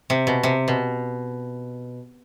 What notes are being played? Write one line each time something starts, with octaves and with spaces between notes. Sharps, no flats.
C3
B2
C3
B2